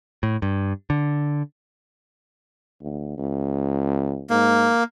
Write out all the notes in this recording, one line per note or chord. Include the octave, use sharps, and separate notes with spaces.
A2
G2
D3
D2
C#2
G#2 A#3